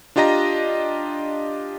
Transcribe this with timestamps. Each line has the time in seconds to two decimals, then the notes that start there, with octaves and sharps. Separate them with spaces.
0.16 D4 F4 G4 D#5 A#5 A#6